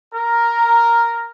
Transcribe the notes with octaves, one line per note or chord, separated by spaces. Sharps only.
A#4